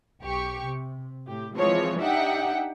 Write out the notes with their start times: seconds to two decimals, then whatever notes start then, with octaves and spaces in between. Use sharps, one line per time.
0.21 B1 G4 C#6
0.63 C3
1.25 A2 G4
1.55 E3 F3 G#3 C4 C#5
1.99 D4 D#4 G4 E5 F#5 G5